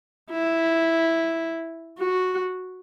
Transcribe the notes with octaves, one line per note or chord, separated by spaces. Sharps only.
E4
F#4